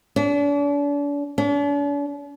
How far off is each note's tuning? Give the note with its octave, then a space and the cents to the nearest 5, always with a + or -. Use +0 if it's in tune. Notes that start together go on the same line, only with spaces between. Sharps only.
D4 -40
D4 -45